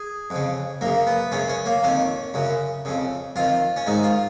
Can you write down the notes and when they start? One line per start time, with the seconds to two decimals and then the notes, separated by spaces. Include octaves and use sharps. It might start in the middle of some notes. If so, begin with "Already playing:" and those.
Already playing: G#4
0.30 F2 C#3
0.81 F#2 C#3 A#3
1.07 B3
1.32 F#2 C#3 C#4
1.49 C#4
1.66 A#3
1.83 F2 D#3 C#4
2.34 F#2 C#3
2.85 F2 C#3
3.36 F2 D#3 F4
3.76 C#4
3.86 G#2 D#3 D#4
4.03 F4